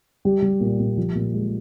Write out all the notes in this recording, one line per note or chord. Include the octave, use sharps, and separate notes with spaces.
G3 G4
G3
A#2
A#2
F3
A#2
G#3